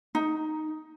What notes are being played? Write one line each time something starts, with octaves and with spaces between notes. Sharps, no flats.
D#4